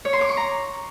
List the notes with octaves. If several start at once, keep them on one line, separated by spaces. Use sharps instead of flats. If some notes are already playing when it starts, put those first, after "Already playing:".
C#5
C6
D6
C#6
A#5